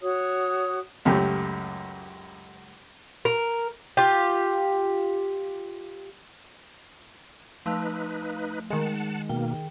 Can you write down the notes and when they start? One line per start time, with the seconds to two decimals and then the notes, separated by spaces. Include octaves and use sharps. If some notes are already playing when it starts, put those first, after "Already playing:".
0.01 F#4 C#5 D#6
1.05 C#2 F#2 A3 C#4 G4
3.25 A#4
3.97 F4 G4
7.66 F3 A3 D#4 B4 F5
8.70 D#3 G#3 F#5 A5
9.29 B2 A#3 G5